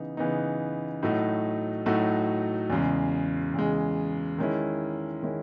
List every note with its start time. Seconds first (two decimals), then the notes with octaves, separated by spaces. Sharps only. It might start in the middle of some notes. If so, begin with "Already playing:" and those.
Already playing: C#3 E3 B3 D#4
0.17 C#3 E3 B3 D#4
1.03 A2 F#3 A3 D#4 F#4
1.86 A2 F#3 A3 D#4 F#4
2.70 E2 C#3 G#3
3.54 E2 C#3 G#3
4.38 D#3 G#3 C#4 E4
5.22 D#3 G#3 C#4 E4